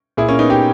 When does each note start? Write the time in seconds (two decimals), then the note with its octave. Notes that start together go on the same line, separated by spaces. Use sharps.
0.17 A#2 E4 G#4
0.29 A#3 C#4
0.39 B3 D#4
0.50 D#4 G4